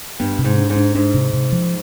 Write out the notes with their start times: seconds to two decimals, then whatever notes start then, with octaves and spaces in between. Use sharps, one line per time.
0.20 G2 B3
0.39 C3
0.45 G#2
0.58 D4
0.70 G#2
0.76 D4
0.95 G#2 D4
1.14 C3
1.34 C3
1.52 F3